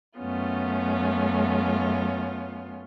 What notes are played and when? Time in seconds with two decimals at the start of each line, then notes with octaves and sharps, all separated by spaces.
0.18 F#2 A3 B3 C#4 F4